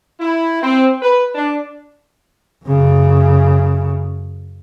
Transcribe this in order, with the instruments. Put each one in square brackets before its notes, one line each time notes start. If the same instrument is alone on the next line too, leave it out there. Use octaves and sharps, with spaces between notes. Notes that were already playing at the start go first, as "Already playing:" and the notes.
[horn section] E4
C4
B4
D4
[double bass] F#2 C#3